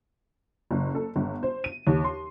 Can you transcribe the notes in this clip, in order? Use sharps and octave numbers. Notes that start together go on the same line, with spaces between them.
F#1
A4
G1
C5
D#7
D#2
C6